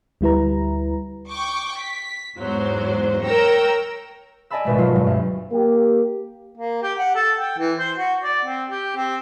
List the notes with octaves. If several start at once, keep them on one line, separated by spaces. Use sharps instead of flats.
D2 G3 E4 B4 A#5
G5 C#6 D6
B6
E2 G#2 F#3 C5
A#4 C#5 G5 A#5 E6
D5 D#5 G#5 A5 B5 E6
G#1 B2 A3
F#3 F4
G2 F#3
D2
A#3 G4
A#3
G4
F#5
A4
G5
E3
C5
F#4
D5
C4
G4
C4